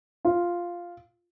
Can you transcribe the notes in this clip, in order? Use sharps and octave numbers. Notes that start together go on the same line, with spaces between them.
F4